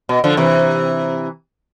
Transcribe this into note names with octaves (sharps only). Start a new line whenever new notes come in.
B2
D3 F3
C3 E3